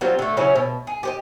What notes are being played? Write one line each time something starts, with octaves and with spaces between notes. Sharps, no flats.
F#3 G3 C4 F4
D3 A3
C#3 F#3 C#4 E4
B2
G#4
G4 C5 D#5